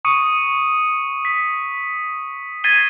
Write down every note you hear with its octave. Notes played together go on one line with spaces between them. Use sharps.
C#6 D#6 C#7 D#7
B6
G#6 A6 B6 C7 D#7 G7